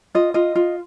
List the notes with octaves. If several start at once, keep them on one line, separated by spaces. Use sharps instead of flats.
F4 D#5
F4 D#5
F4